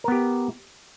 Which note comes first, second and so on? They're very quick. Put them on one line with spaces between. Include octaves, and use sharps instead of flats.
A#4 B3 G4